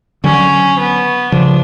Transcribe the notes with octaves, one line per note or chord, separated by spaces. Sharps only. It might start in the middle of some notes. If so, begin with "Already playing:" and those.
D3 F#3 C#4
B3
C#3 F3 D4